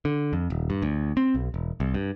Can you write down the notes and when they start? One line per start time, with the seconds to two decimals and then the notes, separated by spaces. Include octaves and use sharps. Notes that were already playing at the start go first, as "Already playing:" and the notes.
0.05 D3
0.33 F2
0.50 D#1
0.70 G2
0.82 D2
1.17 C4
1.35 B1
1.54 E1
1.80 C2
1.94 G2